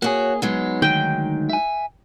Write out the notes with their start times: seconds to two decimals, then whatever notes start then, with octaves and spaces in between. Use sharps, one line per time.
0.02 A#3 F#4 G#4 C#5
0.42 F#3 G#3 B3 D#4
0.82 D2 D#3 G5
1.49 E5 G#5